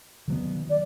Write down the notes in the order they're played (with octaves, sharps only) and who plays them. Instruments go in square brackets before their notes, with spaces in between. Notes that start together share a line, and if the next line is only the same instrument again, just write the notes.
[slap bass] D#3 F#3 B3
[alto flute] D5